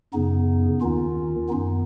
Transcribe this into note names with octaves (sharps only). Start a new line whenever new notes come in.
F#2 C#3 B3 D#4
D#2 D#3 C#4 F4
F#2 D#3 B3 D#4